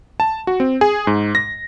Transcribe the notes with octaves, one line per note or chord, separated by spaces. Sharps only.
A5
F#4
C4
G#4
G#2
A#6